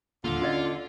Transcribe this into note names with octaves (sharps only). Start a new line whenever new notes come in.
D#1 D3 A#3 F4
C#4 F#4 D5 D#5